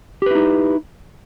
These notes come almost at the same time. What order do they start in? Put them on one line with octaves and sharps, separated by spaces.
G4 B4 E4 D#4